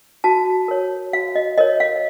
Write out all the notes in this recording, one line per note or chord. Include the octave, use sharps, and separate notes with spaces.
F#4 A5
A#4 C#5
F#4 F5
D#5
A#4 C#5 D#5
F5